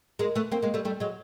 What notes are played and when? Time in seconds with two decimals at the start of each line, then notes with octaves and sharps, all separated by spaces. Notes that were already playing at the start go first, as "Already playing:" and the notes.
0.19 G#3 A#3
0.35 A3 B3
0.52 A#3 C4
0.62 G#3 A#3
0.74 G3 A3
0.85 G3 A3
1.00 F#3 G#3